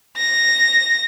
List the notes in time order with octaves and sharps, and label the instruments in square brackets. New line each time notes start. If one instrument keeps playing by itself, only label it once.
[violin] A#6